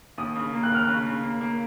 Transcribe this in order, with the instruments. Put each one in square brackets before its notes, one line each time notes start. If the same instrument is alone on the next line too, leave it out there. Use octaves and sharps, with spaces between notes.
[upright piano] D#2 [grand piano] D#6
[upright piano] C#3
A#3
[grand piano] F#6
[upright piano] D#2 [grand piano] F6
[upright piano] C#3 [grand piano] F#6
[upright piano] C#3
A#3
A#3